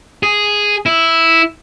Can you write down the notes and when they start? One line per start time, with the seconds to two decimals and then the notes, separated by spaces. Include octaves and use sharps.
0.23 G#4
0.86 E4